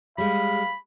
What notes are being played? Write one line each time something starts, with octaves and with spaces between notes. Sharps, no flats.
G3 G#3 F5 B5